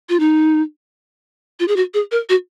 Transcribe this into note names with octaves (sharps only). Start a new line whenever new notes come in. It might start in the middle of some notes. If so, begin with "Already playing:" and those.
F4
D#4
F4
G#4
F#4
G#4
A#4
F#4